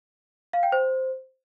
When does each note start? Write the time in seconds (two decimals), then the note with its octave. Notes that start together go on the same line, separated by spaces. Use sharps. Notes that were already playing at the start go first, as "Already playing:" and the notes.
0.53 F5
0.63 G5
0.72 C5